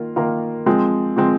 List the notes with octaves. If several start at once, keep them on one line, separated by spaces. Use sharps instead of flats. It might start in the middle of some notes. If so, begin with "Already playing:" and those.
Already playing: D#3 A#3 F4
D#3 A#3 F4 A#4
F3 G#3 C4
F3 G#3 C4